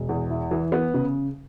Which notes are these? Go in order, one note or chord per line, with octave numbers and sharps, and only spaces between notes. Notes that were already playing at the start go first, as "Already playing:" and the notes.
Already playing: E1
E2
E4
E3
B3
C#3